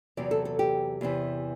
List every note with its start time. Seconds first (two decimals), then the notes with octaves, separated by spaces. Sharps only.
0.17 E2 C3 F#3 D5
0.31 A4
0.45 A4
0.59 G4
1.01 E2 C3 E3